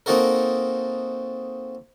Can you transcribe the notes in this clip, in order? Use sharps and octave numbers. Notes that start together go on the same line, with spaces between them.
A#3 C4 D#4 F#4 A4 A#4